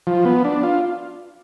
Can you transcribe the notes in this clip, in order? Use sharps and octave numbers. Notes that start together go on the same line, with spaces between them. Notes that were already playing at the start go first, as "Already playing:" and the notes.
F3
B3
D4
F4